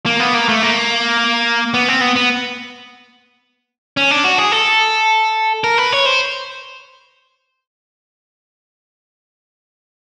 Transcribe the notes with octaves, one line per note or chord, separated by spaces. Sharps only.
A#3
B3
A#3
A3
A#3
B3
C4
B3
B3
C#4
D4
F#4
G#4
A4
A#4
B4
C#5
C5